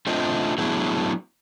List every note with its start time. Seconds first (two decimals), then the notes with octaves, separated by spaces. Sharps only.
0.07 A3 C4 D4 F4 C5 D#5
0.58 F#3 A3 B3 D4 E4 G#4